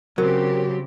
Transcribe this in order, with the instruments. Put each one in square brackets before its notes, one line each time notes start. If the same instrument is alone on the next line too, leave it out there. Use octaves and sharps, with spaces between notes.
[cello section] C#3 C4 G4 [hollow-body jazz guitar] F#3 [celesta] A#4